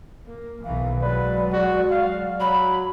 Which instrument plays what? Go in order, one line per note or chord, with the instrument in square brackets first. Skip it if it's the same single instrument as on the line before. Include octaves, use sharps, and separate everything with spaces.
[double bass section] A#3
[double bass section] B1 D#3 E3 [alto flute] F5
[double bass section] F#3 G#3 [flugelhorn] B4 [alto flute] D5
[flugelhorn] F#4
F5
[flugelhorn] F#3 [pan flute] B5